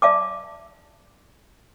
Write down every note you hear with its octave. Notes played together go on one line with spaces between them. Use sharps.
D5 E5 A5 D6